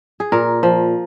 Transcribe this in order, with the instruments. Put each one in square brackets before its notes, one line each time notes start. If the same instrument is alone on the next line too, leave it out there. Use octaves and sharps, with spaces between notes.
[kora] G#4
A#2 A#4
F3